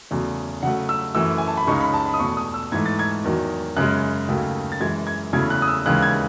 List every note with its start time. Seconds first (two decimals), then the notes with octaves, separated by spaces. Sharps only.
0.11 E2 C#3 F#3 A3
0.63 C#3 F#3 A3 F#5
0.89 E6
1.15 F#2 E3 A3 E6
1.38 G#5
1.48 A5
1.57 B5
1.67 C#2 C#3 G#3 D#4 C#6
1.81 B5
1.94 A5
2.06 B5
2.14 D#6
2.19 E2 B2 A3 C#6
2.37 D#6
2.54 E6
2.72 G#2 E3 A3 G#6
2.85 A6
2.99 G#6
3.24 E2 D#3 F#3
3.76 F#2 C#3 G#3 F#6
4.29 D#2 C#3 F#3 A3
4.72 A6
4.80 F#2 E3 G#3 G#6
5.07 G#6
5.33 E2 C#3 F#3 A3 E4 G#6
5.50 F#6
5.62 D#6
5.68 E6
5.86 D#2 C#3 E3 G#3 F#6
6.02 G#6